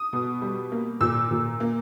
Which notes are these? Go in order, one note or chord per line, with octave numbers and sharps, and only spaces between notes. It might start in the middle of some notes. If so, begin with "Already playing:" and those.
Already playing: D#6
B2
G3
A#3
A#2 E6
A#2
A#3